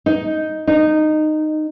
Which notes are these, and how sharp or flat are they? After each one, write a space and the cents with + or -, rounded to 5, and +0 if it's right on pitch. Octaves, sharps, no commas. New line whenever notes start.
D#4 +5
D#4 -15